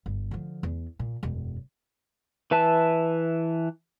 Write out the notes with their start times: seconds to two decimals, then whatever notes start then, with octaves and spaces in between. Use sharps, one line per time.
0.06 G1
0.31 D3 F3
0.63 E2
0.99 A#2
1.23 E1 F#2
2.51 E3 B4 E5 A5